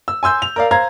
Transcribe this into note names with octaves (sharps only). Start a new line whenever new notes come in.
E6
G#5 C6 E6 G6
F7
A#4 D5 F5
C5 F5 A#5 G#6